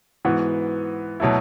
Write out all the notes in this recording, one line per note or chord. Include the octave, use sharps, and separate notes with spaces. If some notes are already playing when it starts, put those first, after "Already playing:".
G#2 E3 B3 F#4
B2 F#3 A3 E4